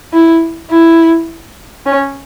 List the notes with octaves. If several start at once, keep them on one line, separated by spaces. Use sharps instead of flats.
E4
E4
C#4